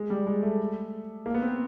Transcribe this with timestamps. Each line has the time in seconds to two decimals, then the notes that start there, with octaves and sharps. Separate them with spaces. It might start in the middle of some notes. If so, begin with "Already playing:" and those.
Already playing: G#3
0.10 G3
0.27 G#3
0.43 A3
1.26 A#3
1.34 B3
1.42 C4